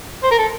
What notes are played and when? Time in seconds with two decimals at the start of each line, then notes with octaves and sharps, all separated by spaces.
0.23 C5
0.31 A#4
0.38 A4